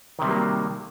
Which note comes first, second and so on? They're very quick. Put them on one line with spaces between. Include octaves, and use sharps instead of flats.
D#3 C3 G3 F#3 A#3